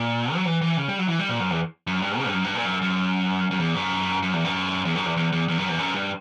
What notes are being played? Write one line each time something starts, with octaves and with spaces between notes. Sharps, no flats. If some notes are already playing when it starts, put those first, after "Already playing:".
Already playing: A#2
F#3
E3
E3
C#3
G3
F#3
E3
G3
A#2
F#2
E2
F#2
G2
C#3
G2
F#2
G2
A#2
F#2
F#2
F#2
E2
F#2
F#2
E2
F#2
E2
F#2
E2
E2
E2
E2
F#2
E2
F#2
G2